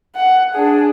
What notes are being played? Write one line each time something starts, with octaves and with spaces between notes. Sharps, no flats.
F#5
D4 G#4